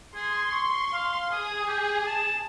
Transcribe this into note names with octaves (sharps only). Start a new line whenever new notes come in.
G#4 C6
C#6
F5
G#4 D#6
G4
A5